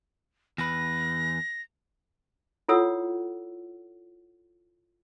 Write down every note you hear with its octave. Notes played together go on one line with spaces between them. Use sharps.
E2 B4 A#6
E4 F4 A4 C#5 F#5 E6